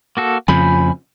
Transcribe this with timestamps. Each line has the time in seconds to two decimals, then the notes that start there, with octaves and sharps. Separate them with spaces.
0.17 A#3 F#4 A4
0.48 F2 C#3 F3 G#5 B5 G6